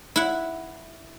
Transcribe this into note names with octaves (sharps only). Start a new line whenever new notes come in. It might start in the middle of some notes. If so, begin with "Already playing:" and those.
E4 F#5